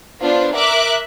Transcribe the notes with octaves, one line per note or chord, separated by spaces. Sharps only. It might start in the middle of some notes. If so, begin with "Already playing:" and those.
B3 D4 F4 C5
A#4 E5 D6 F#6